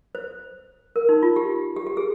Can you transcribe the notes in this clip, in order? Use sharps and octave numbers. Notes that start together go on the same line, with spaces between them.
C5
A#4
D#4
F4
G4
G4
G4
G#4